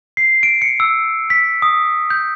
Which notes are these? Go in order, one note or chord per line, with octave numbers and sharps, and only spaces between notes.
C7
D7
C#7
E6
B6
D#6
G6